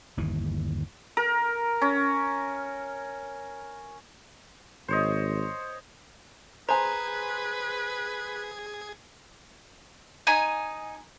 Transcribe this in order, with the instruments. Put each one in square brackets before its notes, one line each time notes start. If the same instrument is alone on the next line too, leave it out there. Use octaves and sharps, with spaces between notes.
[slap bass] G1 D#2 E3
[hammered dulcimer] A#4
C#4
[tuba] G#1 [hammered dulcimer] C5 C#5 D#5
[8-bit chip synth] G#4 G#6 [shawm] B4 [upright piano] C5 G#5 [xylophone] A#5
[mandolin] D#4 G#5